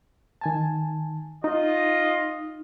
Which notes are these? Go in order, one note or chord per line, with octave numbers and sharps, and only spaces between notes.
D#3 G#5 A5
D#4 F4 D#5